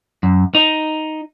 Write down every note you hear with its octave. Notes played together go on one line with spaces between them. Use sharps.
F#2
D#4